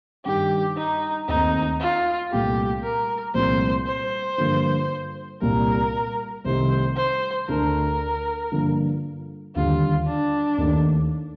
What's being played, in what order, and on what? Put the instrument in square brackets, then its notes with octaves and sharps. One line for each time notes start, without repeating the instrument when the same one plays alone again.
[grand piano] G2 D#3 G3 [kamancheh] G4
[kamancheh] D#4
[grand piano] D#2 D#3 A3 C4 [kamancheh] D#4
[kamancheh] F4
[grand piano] C2 A#2 A3 [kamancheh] G4
[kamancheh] A#4
[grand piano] C2 A#2 F3 A3 C4 [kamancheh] C5
[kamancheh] C5
[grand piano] G2 D3 F3 A#3
[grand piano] C2 A#2 G3 [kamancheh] A#4
[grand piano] C2 C3 D#3 A3 D#4 [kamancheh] C5
[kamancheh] C5
[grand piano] D2 D3 A3 D4 [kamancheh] A#4
[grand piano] G2 D3 F3 A#3
[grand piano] D#2 D3 G3 [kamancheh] F4
[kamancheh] D4
[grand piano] D#2 D#3 A3 D#4